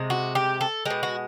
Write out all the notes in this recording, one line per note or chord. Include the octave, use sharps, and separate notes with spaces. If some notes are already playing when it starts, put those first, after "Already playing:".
Already playing: C3 G#3
F#4
G4
A4
B2 G#3 G4
F#4